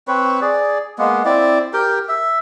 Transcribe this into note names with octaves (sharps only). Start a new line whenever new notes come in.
C4 B4 C#5
G#4 D5
G#3 A#3 B3
C4 E4 D5 D6
G4 A#4 G5
E5